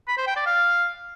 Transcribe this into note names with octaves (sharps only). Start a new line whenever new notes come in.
B5
C5
G5
D5
F5